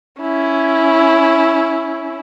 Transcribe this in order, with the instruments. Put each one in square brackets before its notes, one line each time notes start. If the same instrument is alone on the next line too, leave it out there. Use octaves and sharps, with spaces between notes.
[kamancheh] C#4 E4